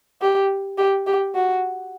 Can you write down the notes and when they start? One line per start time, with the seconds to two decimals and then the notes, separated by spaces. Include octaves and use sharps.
0.21 G4
0.78 G4
1.07 G4
1.35 F#4